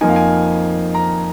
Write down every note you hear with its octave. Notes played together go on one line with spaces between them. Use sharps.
F2 F3 A#3 D#4 G#5
F5
G#5
A#5